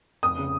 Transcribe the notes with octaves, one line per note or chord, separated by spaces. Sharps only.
F1 D#6
C#3